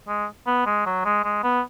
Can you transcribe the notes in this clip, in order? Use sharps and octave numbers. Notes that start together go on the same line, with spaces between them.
G#3
B3
G#3
F#3
G#3
G#3
B3